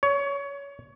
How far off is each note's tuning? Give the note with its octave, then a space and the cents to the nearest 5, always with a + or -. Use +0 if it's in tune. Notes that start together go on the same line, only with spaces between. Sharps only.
C#5 +25